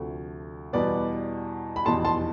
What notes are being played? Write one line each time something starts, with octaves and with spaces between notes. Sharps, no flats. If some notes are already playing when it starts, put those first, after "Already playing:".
Already playing: D2 C3 F3 A3
E2 B2 G3 B4 D5
B5
F1 E2 B2 A5 C6
A5 C6